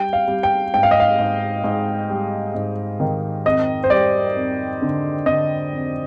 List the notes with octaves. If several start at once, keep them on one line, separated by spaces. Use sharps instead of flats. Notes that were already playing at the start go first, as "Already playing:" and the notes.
Already playing: G3 G5
F5
G3
G5
G#2 G5
F5
D#5
F5
G#2
G#2
G3
G#2
D#3
F2 D#5
C5
G3 D5
F2
D3
D3 D#5
F2